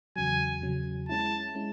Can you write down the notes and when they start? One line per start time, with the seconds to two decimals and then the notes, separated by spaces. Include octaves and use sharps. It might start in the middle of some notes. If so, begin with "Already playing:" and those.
0.16 E2 C#3 F#3 G#5
0.62 E2 C#3 F#3
1.09 G#3 C#4 E4 A5
1.55 G#3 C#4 E4